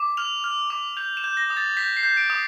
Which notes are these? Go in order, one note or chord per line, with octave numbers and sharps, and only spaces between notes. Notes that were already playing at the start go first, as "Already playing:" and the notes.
Already playing: D6
F6 F7
F6
D6
G6 F7
E7
G6
A#6
D#6
A6
G6 B6
C7
G6
D7
D#6